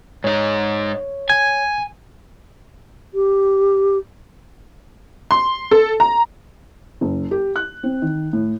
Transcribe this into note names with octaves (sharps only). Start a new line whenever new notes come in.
G#2 D#4 C#5
G#5 G#6
G4
C6
A4
A#5
F#1
G4
F#6
C4
D#3
A2